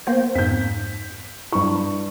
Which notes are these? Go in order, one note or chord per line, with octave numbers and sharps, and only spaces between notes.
A#3 B3 C5
F2 G#2 G6 B6
G2 E4 C#6